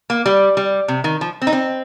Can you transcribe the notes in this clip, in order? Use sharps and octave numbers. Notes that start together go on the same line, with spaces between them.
A#3
G3
G3
C3
D#3
F3
C4
D#4
C4